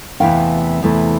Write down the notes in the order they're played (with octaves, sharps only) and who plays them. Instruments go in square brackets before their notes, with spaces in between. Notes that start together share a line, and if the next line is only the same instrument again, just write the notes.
[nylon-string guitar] E2 C3 E3 A3 F5 G5
E2 C3 E3 A3